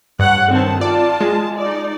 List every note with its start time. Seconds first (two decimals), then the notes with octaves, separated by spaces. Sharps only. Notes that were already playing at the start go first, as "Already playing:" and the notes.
0.19 G2 C#5 F#5
0.50 D#3 C4 A5
0.81 F4 D5 A5
1.21 G#3
1.58 D#4 D5